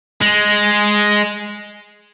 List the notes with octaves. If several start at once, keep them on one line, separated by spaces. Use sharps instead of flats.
G#3